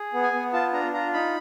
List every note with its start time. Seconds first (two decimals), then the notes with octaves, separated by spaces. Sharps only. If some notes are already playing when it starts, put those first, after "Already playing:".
Already playing: G#4
0.13 B3
0.23 G#5
0.33 B3
0.53 F4 A5
0.73 D4 A#5
0.93 F4 A#5
1.13 D#4 B5